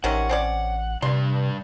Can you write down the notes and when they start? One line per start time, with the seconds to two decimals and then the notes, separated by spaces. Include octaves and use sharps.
0.04 A1 C3 D#3 C#4 F#5
0.29 C4 C#4 D5
1.02 G2 C3 D4 D5 C6